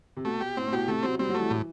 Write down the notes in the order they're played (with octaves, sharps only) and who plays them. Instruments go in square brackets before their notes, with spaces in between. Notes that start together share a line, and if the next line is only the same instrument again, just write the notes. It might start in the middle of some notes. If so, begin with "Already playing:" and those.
[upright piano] C3
[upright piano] B2 [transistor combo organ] A3
[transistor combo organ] G4
[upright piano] A2 [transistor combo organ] C4
[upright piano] A2
[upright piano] B2 [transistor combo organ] G4
[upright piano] C3 [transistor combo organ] A3
[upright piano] F#3 [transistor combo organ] C4
[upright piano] G3 [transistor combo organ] C4
[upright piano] F#3
[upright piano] E3 [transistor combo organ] A3
[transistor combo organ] A2